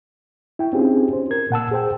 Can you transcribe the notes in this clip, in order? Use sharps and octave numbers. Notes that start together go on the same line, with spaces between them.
E4 G5
C4 C#4 D#4 F4 G4 G#4
C5
A#4 G#6
A#2 F#5 A5 E6
G#4 C5 G5